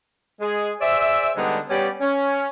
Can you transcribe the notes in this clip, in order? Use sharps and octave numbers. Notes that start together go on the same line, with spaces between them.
G#3 G#4
G#4 C5 D5 E5
D3 G3 G#3 B3 D4 D#4
G3 B3 C#4 G4 D5
C#4